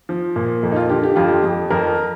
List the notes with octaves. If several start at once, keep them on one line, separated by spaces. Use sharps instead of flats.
F3
A#2
F2
D#4
F4
D3 G4
G4
F2 F4
G4
F2
F2 A#4